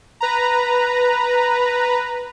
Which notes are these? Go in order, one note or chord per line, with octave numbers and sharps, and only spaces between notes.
B4 A#5